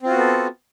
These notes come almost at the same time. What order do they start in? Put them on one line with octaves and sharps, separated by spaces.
C4 F4 F#4 B3 A4